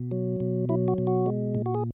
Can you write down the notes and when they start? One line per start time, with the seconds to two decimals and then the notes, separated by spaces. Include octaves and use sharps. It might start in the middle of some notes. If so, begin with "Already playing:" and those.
Already playing: B2
0.11 F#3
0.40 B2
0.69 F#3 E4
0.88 F#4
0.98 B2
1.07 F#4
1.26 G#3
1.55 A#2
1.66 F#4
1.75 G#4